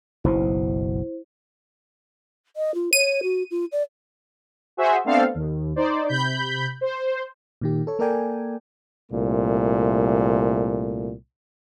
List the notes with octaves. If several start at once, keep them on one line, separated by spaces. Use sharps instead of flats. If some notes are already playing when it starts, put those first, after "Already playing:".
F#1 B1 B2 E4 C5
D#5
F4
C#5 D#7
F#4
F4
D5
F#4 G#4 C5 E5
A3 B3 C4 D4 A4 F5
D#2
D#4 C5 D5
C3 B5 G6
C5
A#2 D#3 G4
A4 C#5
A#3 A4 A#4 D5 G5 G#5
C2 A#2 A3